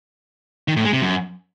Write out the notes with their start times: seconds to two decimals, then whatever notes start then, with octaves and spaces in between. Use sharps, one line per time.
0.68 D#3
0.76 A2
0.85 G#3
0.93 C3
1.02 F#2